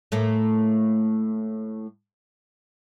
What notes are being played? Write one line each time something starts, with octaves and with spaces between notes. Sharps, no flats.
A2 A3 A#3